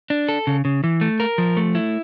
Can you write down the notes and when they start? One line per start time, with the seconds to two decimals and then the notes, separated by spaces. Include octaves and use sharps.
0.10 D4
0.29 A4
0.47 C#3
0.65 C#3
0.84 E3
1.01 A3
1.20 A#4
1.38 F3
1.57 A3
1.75 E4